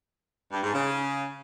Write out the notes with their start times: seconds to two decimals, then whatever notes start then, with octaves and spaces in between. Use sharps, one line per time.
0.52 G2
0.63 G#2
0.74 C#3